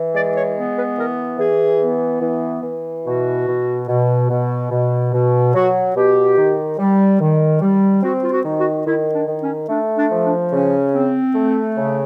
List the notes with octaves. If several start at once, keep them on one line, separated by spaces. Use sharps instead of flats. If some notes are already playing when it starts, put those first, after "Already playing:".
Already playing: E3
G#3 D5
C#5
B3
B4
E3 A#4
E3 G#4
B3
E3
E3
B2 F#4
B2
B2
B2
B2
B2
F#3 F#4
B2 G4
D#3
G3
D#3
G3
C4 F#4
F4
F#4
D#3
F#4
D#3 E4
D4
D#3
C#4
A3 D4
D4
F3
D4
C#3 C#4
C4
A3
C#3